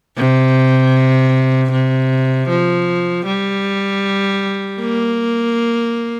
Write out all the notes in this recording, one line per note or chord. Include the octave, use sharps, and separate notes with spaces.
C3
C3
F3
G3
A#3